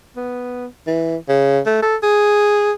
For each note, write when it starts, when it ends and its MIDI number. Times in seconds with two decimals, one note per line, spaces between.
0.17 0.66 59
0.87 1.16 52
1.29 1.60 49
1.66 1.80 57
1.82 1.96 69
2.03 2.72 68